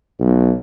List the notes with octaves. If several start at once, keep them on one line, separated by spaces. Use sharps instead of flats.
B1